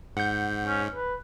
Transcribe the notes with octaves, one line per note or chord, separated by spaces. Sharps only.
G#2 F#5 G6
C#4
B4